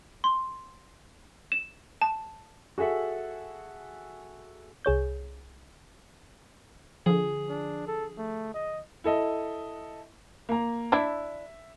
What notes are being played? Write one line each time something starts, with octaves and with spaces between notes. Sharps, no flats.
C6
E7
A5
F#4 G#4 A4 E5 F#5
C2 G#4 C#5 G6
D3 F3 G#4
D4
A4
A3
D#5
E4 A4 D#5
A#3 A#5
D4 E4 E5